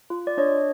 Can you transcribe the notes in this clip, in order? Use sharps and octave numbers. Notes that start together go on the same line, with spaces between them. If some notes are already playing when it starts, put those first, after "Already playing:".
F4
D5
D4 C#5 D#5